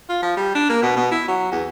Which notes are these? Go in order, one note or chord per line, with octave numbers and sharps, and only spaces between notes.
F4
F3
G3
D4
A#3
B2
B2
E4
F#3
E2